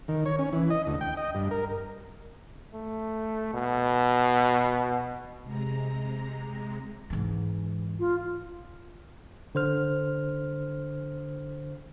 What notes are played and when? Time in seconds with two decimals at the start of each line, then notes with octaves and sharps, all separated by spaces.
0.08 D#3
0.26 C#5
0.39 C#4
0.53 E3
0.70 D#5
0.87 D2
1.01 G5
1.17 D#5
1.35 G2
1.51 A#4
2.73 A3
3.54 B2
5.43 C3 G#3 A#5
7.10 G#2 E3
7.99 F4
9.55 D3 C5 F6